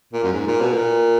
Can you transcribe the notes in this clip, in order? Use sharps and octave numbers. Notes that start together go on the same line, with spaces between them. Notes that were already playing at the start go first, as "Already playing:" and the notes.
A#2
F#2
G#2
A#2
B2
A#2